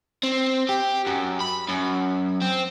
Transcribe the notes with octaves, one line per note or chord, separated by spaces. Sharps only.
C4
G4
F#2
B5
F#2
C4